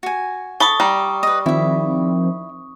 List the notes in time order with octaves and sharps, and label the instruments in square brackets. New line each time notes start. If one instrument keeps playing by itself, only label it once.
[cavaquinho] F#4 G#5
[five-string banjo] A4 B5 [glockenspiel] C#6 D#6
[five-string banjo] G3 [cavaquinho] A#5
[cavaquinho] B4 D#5
[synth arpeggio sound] D#3 F3 C4 [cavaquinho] E4 E5